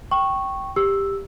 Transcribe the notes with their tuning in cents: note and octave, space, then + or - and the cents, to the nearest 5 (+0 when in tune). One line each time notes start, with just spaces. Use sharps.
G5 -15 C#6 -10
G4 +10 E6 +0